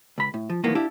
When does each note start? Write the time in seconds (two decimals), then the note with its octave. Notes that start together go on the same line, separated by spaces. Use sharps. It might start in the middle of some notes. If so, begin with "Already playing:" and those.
0.18 C#2 B5
0.34 A2
0.50 F3
0.64 E2 A2 D#3 F#3 A#3 B3
0.75 D4 E4 G4 F5